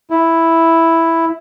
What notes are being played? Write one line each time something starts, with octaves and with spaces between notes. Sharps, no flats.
E4